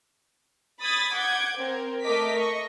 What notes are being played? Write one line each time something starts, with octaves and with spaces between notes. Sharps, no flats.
B5 D#6 G#6 A6 B6
F#5 D6 G6 G#6
C4 A#4
A3 A#4 D#5 D6 B6
D#5 C#6